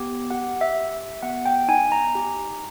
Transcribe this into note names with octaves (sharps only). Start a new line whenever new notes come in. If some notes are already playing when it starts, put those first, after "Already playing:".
Already playing: B3 G4
G4 F#5
E5
G4
B3 F#5
G5
D#4 G#5
A#5
G4